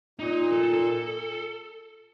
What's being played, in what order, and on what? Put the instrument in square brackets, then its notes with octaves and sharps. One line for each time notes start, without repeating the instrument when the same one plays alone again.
[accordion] A#2 [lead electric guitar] D#4
[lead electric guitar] A4
A4
A4